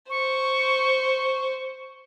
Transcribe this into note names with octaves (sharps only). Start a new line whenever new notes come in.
C5 C#6